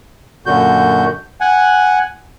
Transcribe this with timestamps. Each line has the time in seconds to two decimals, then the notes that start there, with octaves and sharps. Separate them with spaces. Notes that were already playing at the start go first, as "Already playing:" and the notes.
0.46 F#2 A#2 D3 F#4 G6
1.41 F#5 G#5